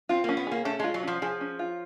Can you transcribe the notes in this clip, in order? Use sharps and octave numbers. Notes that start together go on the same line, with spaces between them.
C4 F4
A#3
C#4
B3
A#3 G#4
A3 C#4
G#3 F4
F#3
F3 C#4
F3 G#4
C#4
F4